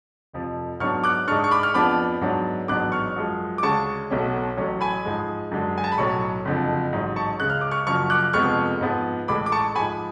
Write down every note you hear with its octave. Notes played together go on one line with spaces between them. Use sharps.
F1 F2 F3
G#2 F#3 B3 D4 C#6 F6
D6 F#6
G#2 G#3 D4 C#6 F6
C#6
B5 D6
F6
F2 F3 B3 D4 B5 D6
G#2 F#3 B3 D4
A1 G#2 F#3 B3 D4 D6 F#6
C#6 F6
F#2 F3 G#3
D6
D2 C#3 G#3 A5 C#6
B1 B2 A3 C#4
A1 A2 F#3 C#4
G#5 B5
G#2 F3 G#3
F#2 D3 G#3 D4
G#5
A5
B5
B1 A2 F#3 C#4 A5 C#6
F#1 F2 D3 F3
A1 G#2 F#3
A5 C#6
C#2 C#3 G#3 F#6
F6
D6
C#6 F6
F#1 F#2 F3 C#6 F6
D6 F#6
F1 F2 F3 G#3 B3 C#6 F6
G#2 F3 B3
A1 A2 G#3 B5 D6
D6
A5 C#6
G#2 F3 G#3 G#5 B5